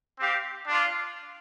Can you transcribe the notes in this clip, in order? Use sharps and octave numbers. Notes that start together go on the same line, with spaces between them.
C4 G4 F5
D4 F4 D5